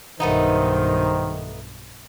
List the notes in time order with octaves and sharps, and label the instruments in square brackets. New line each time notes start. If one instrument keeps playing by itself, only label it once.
[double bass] B1 G2 [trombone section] D#3 [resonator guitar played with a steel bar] A3 B3 D#4 [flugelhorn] C5